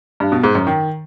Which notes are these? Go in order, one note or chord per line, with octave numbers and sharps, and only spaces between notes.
G2
B2
G#2
F#2
D#3